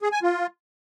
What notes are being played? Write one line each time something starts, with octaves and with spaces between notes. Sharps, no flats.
G#4
G#5
F4